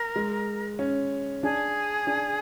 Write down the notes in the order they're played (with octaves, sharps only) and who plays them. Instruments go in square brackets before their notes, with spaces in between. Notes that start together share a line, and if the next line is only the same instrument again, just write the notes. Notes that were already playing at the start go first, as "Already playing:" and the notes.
Already playing: [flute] A#4
[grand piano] G#3
C#4
[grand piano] D4 [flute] G#4
[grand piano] D4